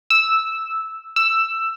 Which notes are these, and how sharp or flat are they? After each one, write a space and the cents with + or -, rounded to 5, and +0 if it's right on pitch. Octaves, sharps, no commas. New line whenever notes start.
E6 -5
E6 +10